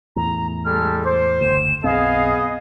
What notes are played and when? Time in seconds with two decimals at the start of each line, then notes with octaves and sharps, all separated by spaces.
0.16 E2 A2 A#5
0.65 G3 G#3 A4 F6
1.04 C5 D6
1.41 F#1 D2 E7
1.84 B1 F#2 B3 C4 G#4 D#5 F5